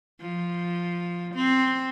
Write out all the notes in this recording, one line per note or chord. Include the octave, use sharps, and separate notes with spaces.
F3
C4